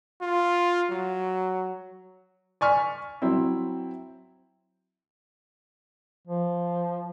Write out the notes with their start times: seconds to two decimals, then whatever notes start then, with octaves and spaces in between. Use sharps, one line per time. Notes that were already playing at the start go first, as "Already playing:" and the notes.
0.22 F4
0.90 F#3
2.61 D5 G#5 C#6 F6 B6
3.22 F#3 C4 E4
6.27 F3